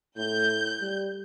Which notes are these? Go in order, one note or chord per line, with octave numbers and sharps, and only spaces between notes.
A2 G6
G3